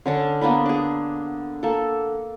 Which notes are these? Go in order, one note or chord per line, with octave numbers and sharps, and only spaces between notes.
D3 C#4 D4
A#3 B3 D4 B4
D4 G#4
A#3 A4